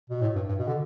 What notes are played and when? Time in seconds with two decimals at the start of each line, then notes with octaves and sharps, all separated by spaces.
0.10 B2
0.21 A2
0.35 G2
0.49 G2
0.59 B2
0.67 D3